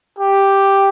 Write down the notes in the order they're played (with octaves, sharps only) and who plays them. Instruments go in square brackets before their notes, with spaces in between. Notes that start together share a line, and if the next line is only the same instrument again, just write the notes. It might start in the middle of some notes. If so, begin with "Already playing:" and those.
[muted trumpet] G4